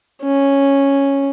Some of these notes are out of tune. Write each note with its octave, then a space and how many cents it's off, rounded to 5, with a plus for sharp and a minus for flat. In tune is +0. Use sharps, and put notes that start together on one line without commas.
C#4 -5